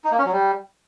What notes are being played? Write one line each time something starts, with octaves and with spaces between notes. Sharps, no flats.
D#4
A#3
C#4
F#3
G3